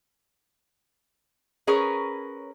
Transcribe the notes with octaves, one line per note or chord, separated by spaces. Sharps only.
C#4 G#4 A#4 B4 C#5